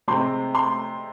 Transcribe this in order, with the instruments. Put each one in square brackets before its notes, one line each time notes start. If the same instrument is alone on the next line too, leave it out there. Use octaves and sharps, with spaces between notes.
[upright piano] C3 G#3 C4 D#4 C6
C6